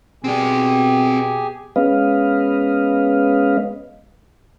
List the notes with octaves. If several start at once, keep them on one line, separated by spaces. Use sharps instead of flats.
B2 C4 G4 G#4 D5 G#5
G#3 B3 C#4 B4 D#5 F5